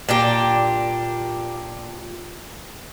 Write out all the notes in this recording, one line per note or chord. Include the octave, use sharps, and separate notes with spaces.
A#2 D4 G4